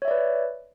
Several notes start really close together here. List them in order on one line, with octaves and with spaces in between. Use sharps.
C#5 E5 D5 B4